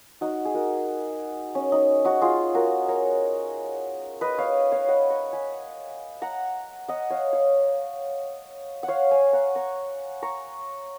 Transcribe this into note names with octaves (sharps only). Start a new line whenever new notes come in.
D#4 F#4
G#4
F#4 A#4
C#4
D#4
D#4 F#4
F4 G#4
F#4 A#4
A#4 C#5
B4 D#5
C#5 F5
C#5 F5
D#5 F#5
A#5 C#6
G#5 B5
F#5 A#5
D#5 F#5
C#5 F5
C#5 F5
F#5
C#5 F5
F5 G#5
F#5 A#5
A#5 C#6
A#5 C#6